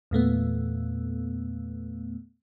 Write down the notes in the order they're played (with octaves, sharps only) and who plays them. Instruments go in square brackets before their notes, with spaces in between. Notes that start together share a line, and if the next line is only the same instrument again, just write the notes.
[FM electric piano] E2 A#2 A3 B3